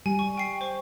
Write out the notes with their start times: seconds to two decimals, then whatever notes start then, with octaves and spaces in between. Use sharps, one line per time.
0.06 G3 G#5
0.19 C#6
0.38 G5 C7
0.61 C5 C#6